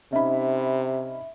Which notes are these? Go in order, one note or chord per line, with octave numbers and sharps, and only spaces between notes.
C3 C#4 D#4 E5 B5